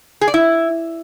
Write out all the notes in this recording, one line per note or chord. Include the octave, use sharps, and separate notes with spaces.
G#4
D5
E4